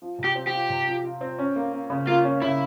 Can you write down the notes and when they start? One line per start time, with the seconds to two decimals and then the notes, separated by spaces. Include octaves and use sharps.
0.02 F3
0.18 C3
0.24 G4
0.35 C4
0.47 G4
0.53 F4
0.69 C3
0.87 F3
1.05 F4
1.21 C4
1.38 C#4
1.56 A#3
1.73 A#3
1.90 C#3
2.07 A#3 F4
2.24 C#4
2.42 C#3 E4